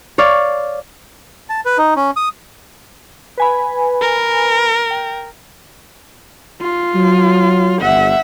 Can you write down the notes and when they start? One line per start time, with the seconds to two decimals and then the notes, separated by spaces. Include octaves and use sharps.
0.18 C#5 D5 F5
1.50 A5
1.66 B4
1.78 D#4
1.96 C#4
2.17 D#6
3.38 B4 G#5 B5
4.02 A#4
4.91 G5
6.61 F4
6.94 F#3
7.81 G1 E5 F#5